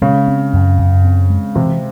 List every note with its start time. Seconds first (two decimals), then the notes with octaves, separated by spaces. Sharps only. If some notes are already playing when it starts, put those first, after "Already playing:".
0.02 C#3 G#3
0.28 C4
0.53 F#2
0.78 F#2
1.05 C4
1.30 G#3
1.55 C3 E3